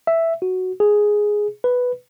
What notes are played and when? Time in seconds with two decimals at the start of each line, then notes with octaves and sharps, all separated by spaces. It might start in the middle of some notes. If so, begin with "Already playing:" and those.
0.07 E5
0.42 F#4
0.80 G#4
1.64 B4